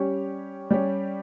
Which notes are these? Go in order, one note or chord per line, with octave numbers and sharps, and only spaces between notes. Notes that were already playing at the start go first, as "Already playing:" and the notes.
Already playing: G3 C#4 G4 C#5
G3 C#4 G4 C#5